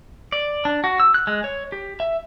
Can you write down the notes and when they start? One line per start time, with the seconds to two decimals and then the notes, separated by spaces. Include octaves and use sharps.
0.32 D5
0.65 D4
0.84 F#4
1.00 E6
1.14 F#6
1.27 G#3
1.44 C#5
1.72 G4
2.00 E5